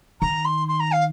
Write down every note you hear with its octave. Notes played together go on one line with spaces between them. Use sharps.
D#3 A#5
C6
C6
A#5
F5